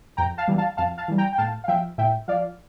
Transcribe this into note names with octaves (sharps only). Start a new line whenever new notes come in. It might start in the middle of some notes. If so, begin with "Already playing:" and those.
F2 G5 A#5
F5 A5
E3 G3
F5 A5
F2 F5 A5
F5 A5
E3 G3
G5 A#5
G5
A2 F5 A5
F5
F3 E5 G5
A2 E5 G5
F3 D5 F5